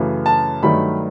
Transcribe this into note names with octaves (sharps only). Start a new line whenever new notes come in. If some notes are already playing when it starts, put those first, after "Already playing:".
Already playing: F#2 C#3 E3 A3
A5
G2 D#3 F#3 A3 B5